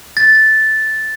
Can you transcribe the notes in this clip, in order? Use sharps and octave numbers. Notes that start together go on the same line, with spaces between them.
A6